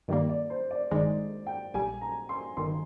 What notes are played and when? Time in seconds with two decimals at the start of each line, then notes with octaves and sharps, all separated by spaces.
0.08 G2 D#3 G3 A#3 D5
0.29 D5
0.50 C5
0.71 D5
0.91 G#1 G2 D#3 G#3 D#4 D5
1.46 G5
1.74 A#1 A#2 G3 G#5
2.01 A#5
2.29 C6
2.57 G1 G2 D#3 C6